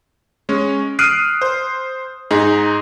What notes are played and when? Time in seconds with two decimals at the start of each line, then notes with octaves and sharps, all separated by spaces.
0.49 G#3 C#4
0.99 D#6 F6 F#6 C7 D7 D#7
1.42 C5
2.31 G#2 D#4 G#4